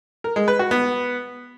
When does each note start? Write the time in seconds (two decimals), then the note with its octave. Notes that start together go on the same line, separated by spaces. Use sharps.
0.24 A#4
0.36 G#3
0.48 B4
0.59 F#4
0.71 B3